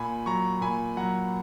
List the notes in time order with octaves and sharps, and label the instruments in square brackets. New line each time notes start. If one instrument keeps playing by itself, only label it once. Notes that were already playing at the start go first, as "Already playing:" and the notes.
Already playing: [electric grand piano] A#2 G#5 B5
F#3 A#5 C#6
A#2 G#5 B5
F#3 F#5 A#5